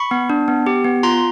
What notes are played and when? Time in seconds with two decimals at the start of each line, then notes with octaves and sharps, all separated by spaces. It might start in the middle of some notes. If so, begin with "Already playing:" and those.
Already playing: B5 C#6
0.11 B3
0.30 D4
0.48 B3
0.66 G4
0.84 B3
1.03 F4 A#5 C6